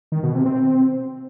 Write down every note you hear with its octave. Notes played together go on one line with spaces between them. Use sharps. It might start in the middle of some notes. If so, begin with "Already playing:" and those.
D#3
B2
C3
C4